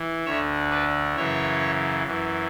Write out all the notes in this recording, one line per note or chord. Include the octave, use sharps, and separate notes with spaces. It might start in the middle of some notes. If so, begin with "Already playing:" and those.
Already playing: E3
D2 D3 C#5 E5
B4 D5
F#2 C#3 E3 C#5 E5
F#2 E3